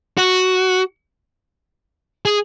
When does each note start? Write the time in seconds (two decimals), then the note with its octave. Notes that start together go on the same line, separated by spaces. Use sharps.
0.18 F#4
2.26 G#4